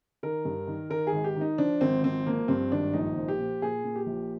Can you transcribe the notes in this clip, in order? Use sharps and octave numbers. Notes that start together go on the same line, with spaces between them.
D#3 A#4
G2
D#3
D#3 A#4
G#4
G#1
G4
D#3
D#4
F3 D4
G#1 C4
F3 C4
F3 A#3
G2 C4
G#1 D4
A#1 D#4
F3
G4
A#2
A#2 G#4
A#2
G4
A#1